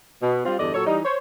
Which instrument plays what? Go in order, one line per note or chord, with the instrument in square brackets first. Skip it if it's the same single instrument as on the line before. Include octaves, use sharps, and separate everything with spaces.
[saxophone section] B2
G3 C4 F4
E2 G2 D3 D5 D#5
A#2 F#3 A4 C#5
E3 G3 D#4
C5 C#5